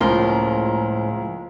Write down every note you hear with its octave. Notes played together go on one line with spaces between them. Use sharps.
C#2 A2 F3 A#3 A#5 C6